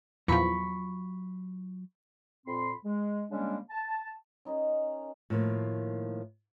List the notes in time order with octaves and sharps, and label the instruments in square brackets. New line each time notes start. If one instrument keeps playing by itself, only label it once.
[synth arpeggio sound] E2 A#2 F3 [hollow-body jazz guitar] F#3 F4 A#5 [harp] B5 C#6
[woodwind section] F2 A#2 C4 B5 C6
G#3
C#3 G3 G#3 A#3 C#4 D4
A5
[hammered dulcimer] C#4 D#4 A#4 D#5
[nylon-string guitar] A2 D#3 F3 A#3